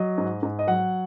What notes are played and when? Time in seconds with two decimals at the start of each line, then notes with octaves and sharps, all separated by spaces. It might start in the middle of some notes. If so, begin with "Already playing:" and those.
Already playing: F#3 D#5
0.18 G#2
0.43 G#2
0.59 D#5
0.67 F#3 F#5